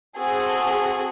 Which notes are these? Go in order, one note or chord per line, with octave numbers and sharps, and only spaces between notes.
C4 F#4 G#4 A4